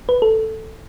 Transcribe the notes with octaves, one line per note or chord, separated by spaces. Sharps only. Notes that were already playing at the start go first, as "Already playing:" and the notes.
B4
A4